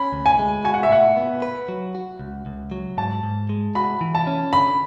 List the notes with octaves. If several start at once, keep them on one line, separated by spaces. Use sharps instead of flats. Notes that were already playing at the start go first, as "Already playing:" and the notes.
Already playing: C#4 B5
D2
G#5
G#3
F#4 G#5
F#5
E5
A2 F#5
B3
B4
F#3
F#4
C#2
C#2
F#3
G#2 A5
G#2
G#3
F#4 B5
E3
A5
C#4
D3 B5